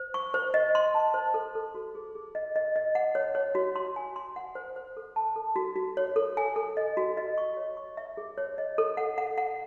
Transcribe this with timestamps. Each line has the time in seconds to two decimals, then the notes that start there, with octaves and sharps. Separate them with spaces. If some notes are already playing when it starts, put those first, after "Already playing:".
Already playing: C5
0.14 C#6
0.34 C5
0.54 D#5
0.75 C6
0.94 A5
1.14 C5
1.34 A4
1.55 A4
1.75 F#4
1.95 G#4
2.15 G#4
2.35 D#5
2.56 D#5
2.76 D#5
2.95 F#5
3.15 C#5
3.35 C#5
3.55 F#4
3.76 C6
3.96 G#5
4.16 C6
4.36 F#5
4.55 C5
4.76 C5
4.97 A4
5.16 A5
5.36 A4
5.56 F#4
5.76 F#4
5.97 C#5
6.16 A4
6.37 G#5
6.56 A4
6.77 D#5
6.97 F#4
7.17 D#5
7.38 C#6
7.57 C#5
7.77 C#6
7.97 E5
8.17 G#4
8.38 C#5
8.58 D#5
8.78 A4
8.97 F#5
9.18 F#5
9.38 F#5